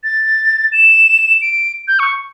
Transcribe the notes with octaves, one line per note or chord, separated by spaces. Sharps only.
A6
E7
D7
G6
C#6